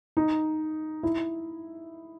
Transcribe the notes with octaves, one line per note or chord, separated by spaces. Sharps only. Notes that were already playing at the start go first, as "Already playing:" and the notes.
D#4
E4